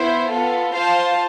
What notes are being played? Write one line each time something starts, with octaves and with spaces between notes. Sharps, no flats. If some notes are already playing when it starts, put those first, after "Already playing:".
Already playing: B3 E4 C5
B3 F4 A4
F4 C5 F5 A5